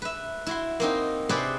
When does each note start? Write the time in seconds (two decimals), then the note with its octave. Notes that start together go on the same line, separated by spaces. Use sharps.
0.02 B4 E5
0.46 E4 F#4 C6
0.80 A#3 C4 D#4
1.29 C3 G#4 B4 C5 D5 G5